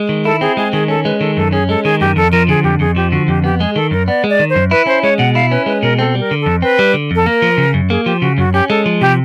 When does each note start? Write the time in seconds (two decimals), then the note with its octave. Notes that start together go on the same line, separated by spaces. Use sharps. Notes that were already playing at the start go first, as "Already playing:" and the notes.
Already playing: G#3
0.09 D#3
0.25 E4 A4
0.41 C4 G#4
0.57 G#3 G#4
0.73 D#3 G#4
0.88 C#4 A4
1.05 G#3 B4
1.20 D#3 A4
1.37 F#2 A4
1.52 C#4 G#4
1.69 G#3 A4
1.84 D#3 G#4
2.01 F#2 G4
2.16 F2 A4
2.32 F3 A#4
2.48 D3 G#4
2.64 F2 G4
2.80 F2 G#4
2.96 F3 G4
3.12 D3 F#4
3.28 F2 G4
3.44 B3 G4
3.59 G#3 G#4
3.76 D#3 A4
3.91 F#2 A#4
4.08 B3 D5
4.24 G#3
4.29 D5
4.39 D#3
4.50 C5
4.55 F#2
4.71 E4 B4
4.87 C#4 C5
5.03 G#3 C#5
5.18 B2 F#5
5.35 E4 F5
5.51 C#4 B4
5.66 G#3 B4
5.82 B2 A#4
5.99 C4 A4
6.15 G3 A#4
6.31 D3
6.41 A4
6.46 F2
6.62 C4 B4
6.79 G3
6.94 D3
7.11 F2 A4
7.26 A#3 A#4
7.42 F3
7.58 C#3
7.74 F#2
7.90 A#3 G#4
8.06 F3 G4
8.21 C#3 F#4
8.38 F#2 F#4
8.53 C#4 G4
8.70 G#3 A4
8.86 F3
9.01 C3 G4